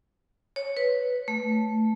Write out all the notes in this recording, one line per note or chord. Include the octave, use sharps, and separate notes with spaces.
C#5
B4
A3